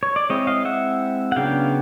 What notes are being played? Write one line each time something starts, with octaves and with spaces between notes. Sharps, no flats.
C#5
D5
G#3 C4 E4 C#5 D#5
D#5 F5
E5 F#5
F#5
C#3 F#3 B3 D4 F5 G5